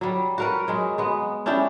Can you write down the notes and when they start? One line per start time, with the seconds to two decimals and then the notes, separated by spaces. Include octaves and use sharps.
0.01 F#3 G3
0.38 F#4 A#4 B4
0.68 F#3 G#3
0.98 G#3 B3
1.46 C#4 D4 E4 G4